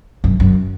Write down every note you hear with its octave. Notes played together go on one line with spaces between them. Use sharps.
F#2
F#2